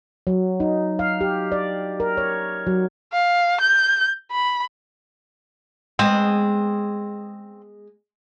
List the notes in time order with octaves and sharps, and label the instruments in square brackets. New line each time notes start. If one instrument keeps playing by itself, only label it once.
[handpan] F#3
D#4
F5
G4
D5
A#4
C#5
F#3
[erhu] F5
G6
B5
[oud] G#3 B3 [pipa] C4